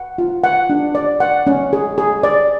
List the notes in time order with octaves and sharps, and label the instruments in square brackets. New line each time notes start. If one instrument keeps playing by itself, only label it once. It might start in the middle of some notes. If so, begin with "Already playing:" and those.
Already playing: [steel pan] F#5
F4
F#5
D4
D5
F#5
C#4
G#4
G#4
D5